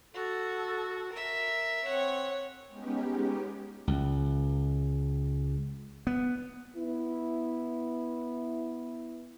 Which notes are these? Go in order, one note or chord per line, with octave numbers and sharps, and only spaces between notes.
F#4 A4
A#4 E5
C4 C#5 F#5
G#3 B3 C#4 D#4 G4
C#2
B3
B3 E4